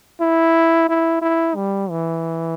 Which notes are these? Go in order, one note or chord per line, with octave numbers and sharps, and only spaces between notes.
E4
E4
E4
G3
E3